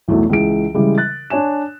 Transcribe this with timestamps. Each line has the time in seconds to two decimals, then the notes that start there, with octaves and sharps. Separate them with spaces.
0.08 B1 E2 A2 E3 F#3 A3
0.29 C#2 E3 G#4 D7
0.74 C#3 E3 G3 G#3
0.98 F#6 A6
1.30 D4 C#5 G#5 E7